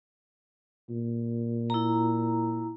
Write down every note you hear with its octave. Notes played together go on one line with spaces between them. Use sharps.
A#2
E4 A#5